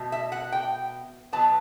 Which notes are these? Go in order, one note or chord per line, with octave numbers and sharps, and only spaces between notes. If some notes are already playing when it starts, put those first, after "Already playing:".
Already playing: B2 A3
E5
F#5
G5
B2 F#3 B3 A5